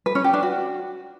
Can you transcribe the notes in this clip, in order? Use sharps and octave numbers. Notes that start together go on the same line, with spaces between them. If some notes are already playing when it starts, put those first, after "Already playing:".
B4
C#4
G4
D4
F#4